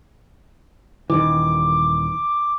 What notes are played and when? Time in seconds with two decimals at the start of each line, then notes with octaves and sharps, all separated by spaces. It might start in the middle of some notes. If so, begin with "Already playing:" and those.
1.10 D#1 D#3 E3 D6